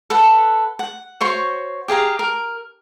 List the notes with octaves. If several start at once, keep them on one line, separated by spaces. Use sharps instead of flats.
A4 B4 F#5
F#5
F#4 C5 C#5 C6
G4 G#4 F5 A#5
A#4